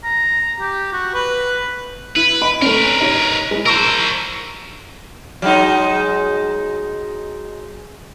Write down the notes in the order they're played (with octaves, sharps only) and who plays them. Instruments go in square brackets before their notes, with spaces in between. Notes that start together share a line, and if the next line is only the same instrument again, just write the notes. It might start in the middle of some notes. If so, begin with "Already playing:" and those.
[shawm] A#5
G4
F#4
B4
[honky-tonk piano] E4 [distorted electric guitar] B4
[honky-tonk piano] D#5 B5 D7
[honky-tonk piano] A3 C#4 [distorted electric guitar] A#4 B4
[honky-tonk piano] D#4 G4 C#5
G#3 E4
[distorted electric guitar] A#4 C5 [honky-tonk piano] A5 C#6 E6
[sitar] F#3 G#3 D#4